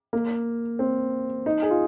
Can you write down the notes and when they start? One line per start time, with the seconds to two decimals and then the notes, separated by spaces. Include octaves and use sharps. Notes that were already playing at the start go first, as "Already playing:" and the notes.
0.13 A#3
0.79 C4
1.46 D#4
1.62 G#4
1.71 F4